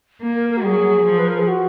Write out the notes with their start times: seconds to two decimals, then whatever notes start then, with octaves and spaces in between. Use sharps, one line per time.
0.22 A#3
0.35 A#4
0.50 A#4
0.57 F#4
0.64 F#3 G#4
1.06 F3
1.19 B4
1.28 A#4
1.39 G#4
1.48 F#4